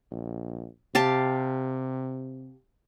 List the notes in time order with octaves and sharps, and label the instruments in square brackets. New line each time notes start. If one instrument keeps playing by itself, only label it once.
[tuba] A#1
[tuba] C3 [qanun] G4 F5 A5